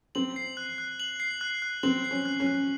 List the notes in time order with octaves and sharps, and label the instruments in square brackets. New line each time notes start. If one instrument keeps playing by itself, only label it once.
[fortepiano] C4 [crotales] F#7
[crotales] C7
F#6
F#6
F#7
C7
F#6
F#6
[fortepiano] C4 [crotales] F#7
[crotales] C7
[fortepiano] C#4
[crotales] F#6
[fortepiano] C#4
[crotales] F#6